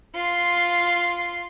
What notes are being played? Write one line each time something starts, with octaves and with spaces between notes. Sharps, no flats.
F4 C6